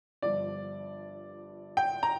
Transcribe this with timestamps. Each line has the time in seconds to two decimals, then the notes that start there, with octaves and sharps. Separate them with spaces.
0.22 G1 G2 F3 D5
1.77 G5
2.03 A#5